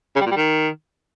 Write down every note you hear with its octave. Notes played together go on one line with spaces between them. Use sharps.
C#3
G3
A#2
G3
D#3